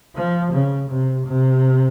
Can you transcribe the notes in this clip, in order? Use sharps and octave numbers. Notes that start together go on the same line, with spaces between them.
F3
C#3
C3
C3